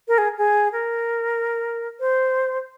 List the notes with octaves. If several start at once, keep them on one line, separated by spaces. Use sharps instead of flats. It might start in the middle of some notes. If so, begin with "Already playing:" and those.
A#4
G#4
G#4
A#4
C5